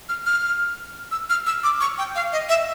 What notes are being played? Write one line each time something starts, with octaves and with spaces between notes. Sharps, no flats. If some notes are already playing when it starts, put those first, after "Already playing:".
F6
F6
E6
F6
E6
D6
C#6
G5
F5
D#5
E5